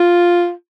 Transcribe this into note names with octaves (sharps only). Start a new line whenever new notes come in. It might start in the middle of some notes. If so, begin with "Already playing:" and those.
Already playing: F4